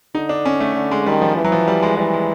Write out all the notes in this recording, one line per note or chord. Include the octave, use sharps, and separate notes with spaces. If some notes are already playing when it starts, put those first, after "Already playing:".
D3 D#4
D4
C#4
A3
D3
G#3
D#3 G3
F3
E3
F#3
F3
G3
G#3
E3 G3
G#3